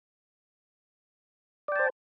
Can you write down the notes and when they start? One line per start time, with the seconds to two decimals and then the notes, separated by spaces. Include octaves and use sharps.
1.68 D5
1.72 G5
1.76 A5
1.79 C5